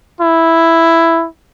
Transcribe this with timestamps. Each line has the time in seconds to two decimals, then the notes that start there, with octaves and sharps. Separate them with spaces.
0.21 E4